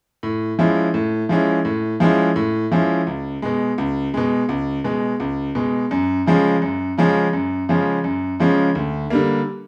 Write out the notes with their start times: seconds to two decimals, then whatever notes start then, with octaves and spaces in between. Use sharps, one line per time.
0.23 A2
0.59 F3 G#3 C#4 E4
0.94 A2
1.29 F3 G#3 C#4 E4
1.65 A2
2.00 F3 G#3 C#4 E4
2.36 A2
2.72 F3 G#3 C#4 E4
3.07 C#2
3.42 B2 G#3
3.78 C#2
4.14 B2 G#3
4.49 C#2
4.84 B2 G#3
5.20 C#2
5.55 B2 G#3
5.91 F#2
6.26 C#3 F3 G#3 C#4
6.62 F#2
6.98 C#3 F3 G#3 C#4
7.33 F#2
7.69 C#3 F3 G#3 C#4
8.04 F#2
8.40 C#3 F3 G#3 C#4
8.75 D2
9.10 D3 G3 A#3